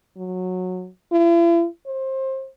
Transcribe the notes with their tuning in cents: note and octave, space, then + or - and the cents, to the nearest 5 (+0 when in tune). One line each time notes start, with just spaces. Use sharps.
F#3 -15
E4 +45
C5 +25